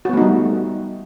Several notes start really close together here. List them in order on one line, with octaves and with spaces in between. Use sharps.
F#4 B3 A3 D#4 G3